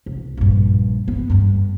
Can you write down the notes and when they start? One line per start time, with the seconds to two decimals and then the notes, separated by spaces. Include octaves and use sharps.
0.06 C2
0.37 A#1 G2
1.08 B3
1.30 G1 G2